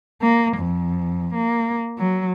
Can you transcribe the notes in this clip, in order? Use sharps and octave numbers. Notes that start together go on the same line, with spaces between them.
A#3
F2
A#3
F#3